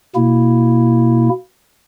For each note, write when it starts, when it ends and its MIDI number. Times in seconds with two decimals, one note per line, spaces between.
0.15 1.29 47
0.15 1.29 58
0.15 1.29 64